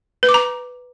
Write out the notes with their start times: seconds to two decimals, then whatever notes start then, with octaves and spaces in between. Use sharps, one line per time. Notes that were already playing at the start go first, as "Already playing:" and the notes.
0.23 B4
0.29 D6
0.34 A#5